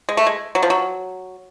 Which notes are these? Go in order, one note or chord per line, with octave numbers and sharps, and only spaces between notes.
G#3
A3
G#3
F#3
F3
F#3